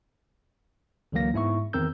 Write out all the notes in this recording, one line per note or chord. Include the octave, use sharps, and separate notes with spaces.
C#2 D3 E3 F#3 A#3 A#6
G#2 B3 E4 E5 C#6
E2 D#3 C4 A#4 E6 G6